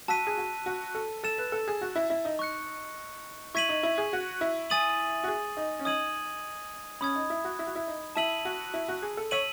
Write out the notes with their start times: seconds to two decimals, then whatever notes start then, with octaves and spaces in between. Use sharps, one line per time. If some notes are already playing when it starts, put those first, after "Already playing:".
0.08 F#4 A5 E6 B6 D#7
0.27 G#4
0.38 F#4
0.66 F#4
0.95 A4
1.24 A4 E6 A6 E7
1.38 B4
1.52 A4
1.68 G#4
1.81 F#4
1.95 E4
2.10 E4
2.25 D#4
2.39 C#6 F#6 C#7
3.54 E4 C#6 G#6 B6 D#7 F#7
3.69 D#4
3.83 E4
3.98 G#4
4.13 F#4
4.41 E4
4.70 G#5 D#6 A6 D#7 F#7
5.24 F#4
5.28 G#4
5.57 D#4
5.79 C#4
5.85 D#4 D#6 G#6 D#7 F#7
7.01 C#4 B5 D#6 G#6
7.16 D#4
7.30 E4
7.44 F#4
7.59 E4
7.67 F#4
7.75 E4
7.87 D#4
8.16 E4 A5 E6 B6 D#7 F#7
8.45 F#4
8.74 E4
8.88 F#4
9.02 G#4
9.17 A4
9.31 C#5 E6 B6 D#7 F#7